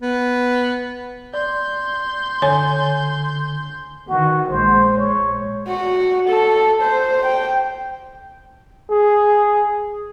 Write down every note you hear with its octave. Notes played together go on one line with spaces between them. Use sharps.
B3
D5 C6 G6
D3 C#5 G#5
D#3 E3 F#4
A#1 G#3 C5
C#5
F#4
A4
C5
G5
G#4